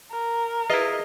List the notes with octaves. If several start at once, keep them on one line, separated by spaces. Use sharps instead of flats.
A#4
E4 F4 G#4 B4 D#5 E5